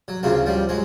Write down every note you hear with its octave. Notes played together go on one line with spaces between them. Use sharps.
F#3
D2 C#3 F3 F#3
F3 G3
F#3 G#3